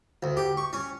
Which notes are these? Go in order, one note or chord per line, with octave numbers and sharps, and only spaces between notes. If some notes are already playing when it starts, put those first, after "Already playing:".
D2
G4
C#6
C#4